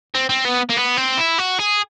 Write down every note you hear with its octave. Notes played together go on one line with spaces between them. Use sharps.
C4
C4
B3
A#3
B3
C4
E4
F#4
G#4